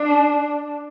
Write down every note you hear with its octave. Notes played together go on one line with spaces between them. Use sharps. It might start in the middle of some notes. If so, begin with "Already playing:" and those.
Already playing: D4